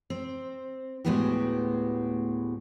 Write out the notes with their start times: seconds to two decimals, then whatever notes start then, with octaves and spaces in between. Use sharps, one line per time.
0.10 C4
1.05 D2 A2 G#3 B3 F#4 G4